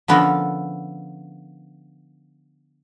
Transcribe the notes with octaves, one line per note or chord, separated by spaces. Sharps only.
D3 F3 B3 C#4 A4 A#4